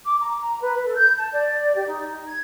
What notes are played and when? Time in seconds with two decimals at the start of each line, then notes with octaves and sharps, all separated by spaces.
0.05 D6
0.21 A#5
0.61 B4
0.84 A4
0.96 G6
1.18 A5
1.33 D5
1.75 G4
1.87 D#4
2.27 G#6